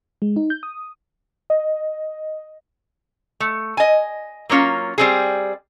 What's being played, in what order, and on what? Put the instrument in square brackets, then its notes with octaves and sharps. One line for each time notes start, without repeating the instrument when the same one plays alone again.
[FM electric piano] G#3
D#4
G6
D#6
[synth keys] D#5
[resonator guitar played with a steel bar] A3
D#5 G#5
F#3 A#3 C#4 F4
G3 C4 G#4